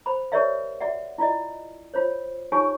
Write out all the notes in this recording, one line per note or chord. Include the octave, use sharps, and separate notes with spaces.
C5 B5
G4 A#4 C#5 D5 E5 F5
F#4 D5 E5 F#5
E4 F4 D5 D#5
F4 C5 C#5
D#4 F4 G4 C#5 G#5 C#6